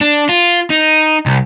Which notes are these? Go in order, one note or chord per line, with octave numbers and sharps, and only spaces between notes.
D4
F4
D#4
C2